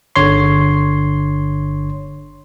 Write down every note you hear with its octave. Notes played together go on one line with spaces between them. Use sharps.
G1 D3 C#5 C6